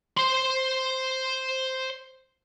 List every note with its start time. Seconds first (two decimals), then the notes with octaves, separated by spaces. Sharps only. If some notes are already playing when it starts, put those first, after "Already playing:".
0.18 C5 C6